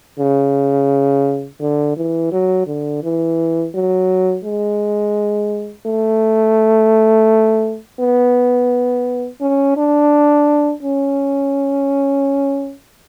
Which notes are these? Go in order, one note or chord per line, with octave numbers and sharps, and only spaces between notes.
C#3
D3
E3
F#3
D3
E3
F#3
G#3
A3
B3
C#4
D4
C#4